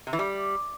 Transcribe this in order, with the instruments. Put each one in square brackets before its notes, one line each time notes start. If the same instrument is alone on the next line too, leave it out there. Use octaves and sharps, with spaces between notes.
[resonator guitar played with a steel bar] C3
E3
G3